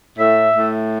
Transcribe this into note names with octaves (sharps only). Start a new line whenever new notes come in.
A2 E5
A2